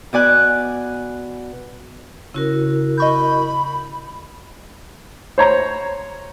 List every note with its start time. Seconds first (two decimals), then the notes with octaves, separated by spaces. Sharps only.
0.13 B2 D5 G#5 F#6
2.34 C#3 C#4 E4 F#4 A#4
2.98 D#5 B5 C#6 G6
5.38 C5 C#5 A#5